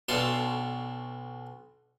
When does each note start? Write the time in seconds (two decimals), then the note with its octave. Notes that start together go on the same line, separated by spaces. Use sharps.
0.09 B1 B2 D4 A4 F5 C6